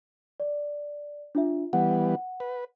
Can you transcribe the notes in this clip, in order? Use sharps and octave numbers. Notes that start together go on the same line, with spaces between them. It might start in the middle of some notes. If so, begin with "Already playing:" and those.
D5
D4 F4 E5
E3 G3 B3 F#5
B4